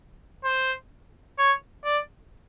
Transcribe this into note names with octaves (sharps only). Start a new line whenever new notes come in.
C5
C#5
D5